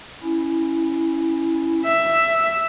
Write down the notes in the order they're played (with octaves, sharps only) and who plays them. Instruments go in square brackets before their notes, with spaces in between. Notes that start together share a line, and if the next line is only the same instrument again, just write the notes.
[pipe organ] C#4 E4
[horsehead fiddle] E5